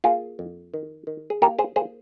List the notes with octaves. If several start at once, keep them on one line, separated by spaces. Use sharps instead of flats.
A#3 F4 G#4
F2
D#3
D#3
G#4
A#3 G4 A#4
G#4 C5
A#3 G#4 C5